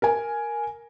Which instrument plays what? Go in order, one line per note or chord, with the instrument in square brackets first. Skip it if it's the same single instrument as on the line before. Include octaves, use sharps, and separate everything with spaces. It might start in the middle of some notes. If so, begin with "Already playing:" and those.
[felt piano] A#4 G#5